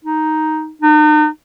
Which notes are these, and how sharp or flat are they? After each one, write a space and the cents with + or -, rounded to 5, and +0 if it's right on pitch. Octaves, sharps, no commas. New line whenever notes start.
D#4 +5
D#4 -40